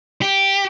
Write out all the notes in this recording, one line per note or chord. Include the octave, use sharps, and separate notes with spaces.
G4